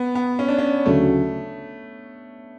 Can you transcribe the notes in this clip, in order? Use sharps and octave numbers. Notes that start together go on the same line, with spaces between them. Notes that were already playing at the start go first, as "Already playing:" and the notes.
Already playing: B3
B3
C#4
D4
C#4
D2 C#3 F#3 A3